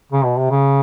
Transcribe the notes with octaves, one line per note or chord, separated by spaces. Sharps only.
C#3
B2
C3
C#3